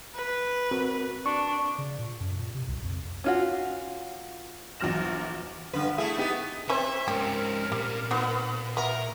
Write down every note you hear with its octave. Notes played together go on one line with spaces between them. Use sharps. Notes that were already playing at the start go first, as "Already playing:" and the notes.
B4
C4 F#4 A#4
D4 C#6
C#3
A#2
F#2
A#2
C3
C2
F2
C#4 F4 F#4
A#1 E2 F#3 F6 A#6 E7
G2 D3 B4
A3 E4 G#4
B3 D#4 G4
C4 C#4 B4 C5 E5
G#2 C#4 G4 A#4
A#2 G3
A#3 B3 D#4 F#4
B3 F#4 A#4 E5